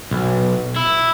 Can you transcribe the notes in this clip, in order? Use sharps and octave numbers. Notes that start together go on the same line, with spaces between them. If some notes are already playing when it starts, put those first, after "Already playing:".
B1
E4